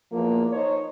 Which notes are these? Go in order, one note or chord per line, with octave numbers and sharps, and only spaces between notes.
E2 F3 A#3
D#4 C5 C#5